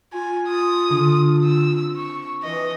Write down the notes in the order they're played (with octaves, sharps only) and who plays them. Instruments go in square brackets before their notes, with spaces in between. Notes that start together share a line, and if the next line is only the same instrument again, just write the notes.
[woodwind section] F4 [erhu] G#5
[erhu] D#6
[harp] D3
[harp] C4 D#7 [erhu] E6
[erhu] C#6
[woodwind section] E3 [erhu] D#5